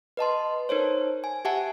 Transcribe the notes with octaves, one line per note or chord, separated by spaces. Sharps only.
B4 D#5 A5 C6
D#4 A#4 C5 C#5
G#5
G4 E5 F#5 G#5 A5